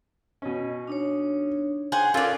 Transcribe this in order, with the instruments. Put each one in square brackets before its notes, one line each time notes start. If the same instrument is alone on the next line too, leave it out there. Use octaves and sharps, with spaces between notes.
[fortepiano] B2 C#4 [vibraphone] D#5
[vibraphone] D4 D#4 C#5
[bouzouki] G#4 C5 F#5 [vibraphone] G5
[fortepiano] C#4 A4 A#4 [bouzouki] F4 D5